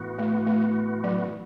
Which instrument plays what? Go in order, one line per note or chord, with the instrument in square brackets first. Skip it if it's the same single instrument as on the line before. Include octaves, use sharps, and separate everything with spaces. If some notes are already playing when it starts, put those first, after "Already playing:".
Already playing: [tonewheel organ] A2 E3 B3 F#4
[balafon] A3
A3
F#3